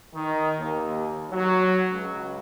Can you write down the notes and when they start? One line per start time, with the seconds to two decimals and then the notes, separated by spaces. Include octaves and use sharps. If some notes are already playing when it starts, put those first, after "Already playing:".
0.13 D#3
0.58 D#2
1.31 F#3
1.90 C#2